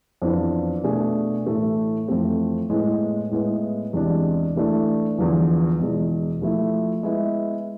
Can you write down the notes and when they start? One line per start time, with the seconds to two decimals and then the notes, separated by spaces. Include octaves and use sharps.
0.22 F2 E3 B3 D4 F4
0.84 B2 A3 D4 G#4
1.46 A2 E3 A3
2.08 F2 E3 A3 C4
2.70 A2 G#3 B3
3.31 A2 G#3 B3 E4
3.93 E2 C3 G#3 D4
4.56 E3 A3 D4
5.17 E2 D3 F3 B3
5.79 E2 B2 G#3
6.42 F3 A3 E4
7.03 G#3 B3 E4